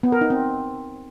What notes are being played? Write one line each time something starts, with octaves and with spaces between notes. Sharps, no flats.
B3
A#4
D#4
C4